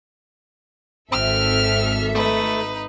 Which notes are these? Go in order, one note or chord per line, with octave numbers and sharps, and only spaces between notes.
G#1 C4 A4 E5 F6
A3 D#4 B4